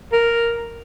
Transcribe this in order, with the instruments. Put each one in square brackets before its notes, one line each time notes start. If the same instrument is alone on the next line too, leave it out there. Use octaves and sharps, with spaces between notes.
[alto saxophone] A#4